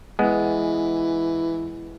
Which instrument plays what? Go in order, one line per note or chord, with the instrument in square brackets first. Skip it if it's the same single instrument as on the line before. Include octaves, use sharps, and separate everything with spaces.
[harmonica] E3 [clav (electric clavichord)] G#3 B3